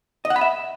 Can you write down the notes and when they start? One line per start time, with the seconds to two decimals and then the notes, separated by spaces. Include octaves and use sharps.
0.25 D#5
0.30 F#5
0.36 B5
0.41 E5